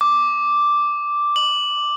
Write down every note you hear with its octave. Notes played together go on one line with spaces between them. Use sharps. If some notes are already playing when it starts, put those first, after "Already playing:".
D6
F#7